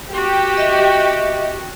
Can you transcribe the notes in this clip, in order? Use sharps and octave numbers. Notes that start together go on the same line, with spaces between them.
F#4 G4
D#5 E5